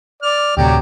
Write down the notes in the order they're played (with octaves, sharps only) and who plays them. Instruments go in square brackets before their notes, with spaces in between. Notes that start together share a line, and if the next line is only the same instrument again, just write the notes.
[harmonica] D5 F6
[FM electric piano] D2 A2 C3 [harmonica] F#3 G4 D5